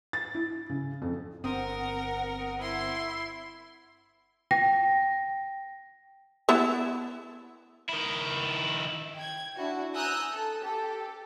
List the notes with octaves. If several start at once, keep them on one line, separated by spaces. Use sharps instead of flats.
A6
E4
C#3
F2
G1 C4 A#4 F#5 D#6
E4 C6
G5 A#6
B3 E4 E5
D#3 E4
G5 G#6
D4 E4 F#4
G#5 A#5 D#6 E6 F#6 G6
A4
G4 A4